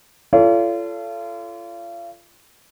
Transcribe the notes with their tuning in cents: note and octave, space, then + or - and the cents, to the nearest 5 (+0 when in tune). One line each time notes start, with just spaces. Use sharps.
F4 -35 A4 +0 C#5 +45